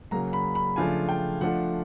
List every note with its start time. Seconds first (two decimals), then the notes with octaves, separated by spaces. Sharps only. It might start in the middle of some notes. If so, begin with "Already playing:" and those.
0.11 C#3 F#3 A#3 A#5
0.33 B5
0.55 B5
0.76 C#3 F3 A3 D4 F4 G#5
1.09 G5
1.41 F3 A3 D4 F4 F#5